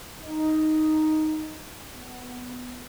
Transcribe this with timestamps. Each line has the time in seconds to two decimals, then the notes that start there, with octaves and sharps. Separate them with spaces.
0.21 D#4
1.93 B3